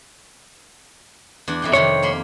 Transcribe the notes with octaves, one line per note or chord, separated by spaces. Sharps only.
E2 D4
F2 E3 G5
F2 C3 D#3 C#5
A#3 B5 C6